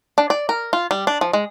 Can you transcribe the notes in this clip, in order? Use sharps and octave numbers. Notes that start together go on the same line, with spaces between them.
D4
D5
A#4
F4
G3
D4
F3
G#3